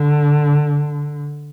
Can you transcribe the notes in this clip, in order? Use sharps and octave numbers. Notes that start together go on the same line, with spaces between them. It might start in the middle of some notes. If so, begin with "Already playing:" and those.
Already playing: D3